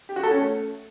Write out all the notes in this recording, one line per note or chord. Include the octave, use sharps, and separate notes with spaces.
G4
F#4
A4
C#4
A3